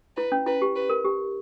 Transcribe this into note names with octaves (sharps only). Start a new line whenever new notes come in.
E4 B4
C#4
E4 B4
G4
B4
A#4
G4